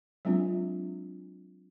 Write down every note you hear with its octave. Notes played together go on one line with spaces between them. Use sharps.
F#3 G#3 C4 D4 F4